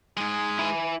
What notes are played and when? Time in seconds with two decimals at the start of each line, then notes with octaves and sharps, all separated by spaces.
0.17 G#2 G#3 G#4
0.59 E4 G#5